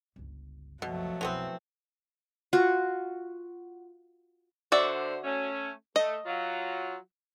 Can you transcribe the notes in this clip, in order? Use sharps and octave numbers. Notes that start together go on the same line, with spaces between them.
G1 C#2
F#1 C2 B2 F3 F#3 A3
B1 F2 E3 B3 C4
F4 F#4
D3 F#4 C5 D5 E5
A3 C#4
A3 D#5
F#3 F4